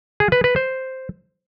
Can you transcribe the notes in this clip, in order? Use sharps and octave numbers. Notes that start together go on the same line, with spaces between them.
G#4
B4
B4
C5